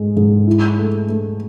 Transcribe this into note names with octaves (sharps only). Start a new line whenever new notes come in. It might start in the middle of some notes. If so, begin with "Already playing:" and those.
Already playing: G#2 G#3
G#2
E4
A3
A3